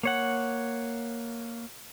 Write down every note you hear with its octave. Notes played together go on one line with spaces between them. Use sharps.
A#3 C#5 F#5